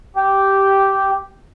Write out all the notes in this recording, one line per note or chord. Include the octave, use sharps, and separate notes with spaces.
G4